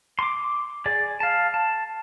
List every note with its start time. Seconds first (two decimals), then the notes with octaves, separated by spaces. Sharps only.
0.19 C6 D6
0.86 G#4 D5
1.20 F5 A5
1.54 A5